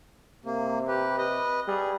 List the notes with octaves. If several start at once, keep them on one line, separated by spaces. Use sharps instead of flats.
C3 A#3
G4 B4
B4 D#5
G3 G#4